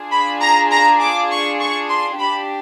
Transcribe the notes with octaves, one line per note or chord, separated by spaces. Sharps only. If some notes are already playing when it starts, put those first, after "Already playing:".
Already playing: D4 F4 G#4
B5
A#5
A#5
D6
C#6
C#6
C6
D4 G4 B5